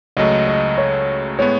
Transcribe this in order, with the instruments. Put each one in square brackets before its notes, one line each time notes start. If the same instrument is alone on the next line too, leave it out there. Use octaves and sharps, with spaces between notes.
[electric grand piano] C#2 C#3 F#3 A3 [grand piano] D#5
[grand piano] D#5
C#5
[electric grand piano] A2 G#3 B3 [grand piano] C#5